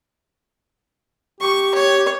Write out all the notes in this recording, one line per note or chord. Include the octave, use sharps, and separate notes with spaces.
G4 C#6
C#5